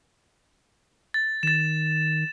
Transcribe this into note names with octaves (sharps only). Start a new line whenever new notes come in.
A6
D#3 A6 E7